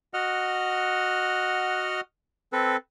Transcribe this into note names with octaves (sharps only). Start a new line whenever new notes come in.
F#4 D#5 F#5 F6
C4 A4 B4